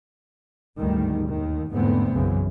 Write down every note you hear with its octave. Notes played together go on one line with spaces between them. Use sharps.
G1 D2 G#2 D#3 G3
D#2 D#3
E2 G#2 D3 A3 B3 C4
B1 F#2 C#3 E3